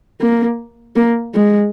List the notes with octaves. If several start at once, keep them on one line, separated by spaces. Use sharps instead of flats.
A#3
A#3
G#3